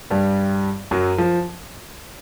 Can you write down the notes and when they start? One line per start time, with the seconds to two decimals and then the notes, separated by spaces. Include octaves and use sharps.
0.10 G2 G3
0.91 F#2 F#3
1.18 F3